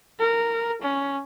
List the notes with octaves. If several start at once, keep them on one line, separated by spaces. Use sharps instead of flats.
A#4
C#4